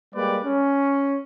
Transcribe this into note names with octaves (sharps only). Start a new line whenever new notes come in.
G3 G#3 A#3 G4 B4 D5
C#4